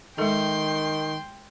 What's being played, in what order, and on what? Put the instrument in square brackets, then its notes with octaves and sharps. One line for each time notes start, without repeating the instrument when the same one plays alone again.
[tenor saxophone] D#3 [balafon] G#3 A4 [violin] G5 C6